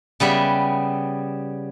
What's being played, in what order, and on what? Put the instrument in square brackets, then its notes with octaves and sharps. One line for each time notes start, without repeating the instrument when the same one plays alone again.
[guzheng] C#3 G3 B3 E5